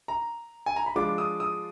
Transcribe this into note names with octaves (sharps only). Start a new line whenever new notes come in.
A#5
G#5
A#5
B5
F3 G#3 D4 F4 D6
D#6
D#6